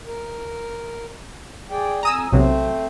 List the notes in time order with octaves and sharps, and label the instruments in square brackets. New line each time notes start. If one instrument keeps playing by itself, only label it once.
[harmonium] A#4
G#4 D5 G5
[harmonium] F2 G#5 [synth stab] A#5 D#6 E6
[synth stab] B1 C3 F#3 [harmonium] A3 C4 C5